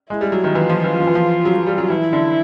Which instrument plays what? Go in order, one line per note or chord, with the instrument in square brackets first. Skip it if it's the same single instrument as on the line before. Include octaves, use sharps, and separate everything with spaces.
[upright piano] G#3 [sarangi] E4
[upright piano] G3
F#3
D#3
[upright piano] E3 [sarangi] F4
[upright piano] F3
E3
F3
E3
F3
F#3
F#3
G3
F#3
[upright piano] E3 [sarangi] E4
[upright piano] D3